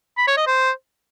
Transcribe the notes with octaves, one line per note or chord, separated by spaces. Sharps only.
B5
C#5
D#5
C5